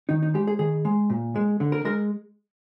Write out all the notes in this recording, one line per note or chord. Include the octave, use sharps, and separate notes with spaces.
D#3 D#4
D#4
G#3 G4
G#4
D#3 G#4
G#3
A#2
G#3
D3
A#4
G#3 A#4